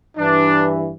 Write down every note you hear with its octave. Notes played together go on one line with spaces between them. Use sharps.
G2 E3 D4